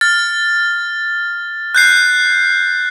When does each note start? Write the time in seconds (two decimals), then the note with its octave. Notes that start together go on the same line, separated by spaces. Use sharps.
0.01 F6 A6
1.75 F#6 G6 C7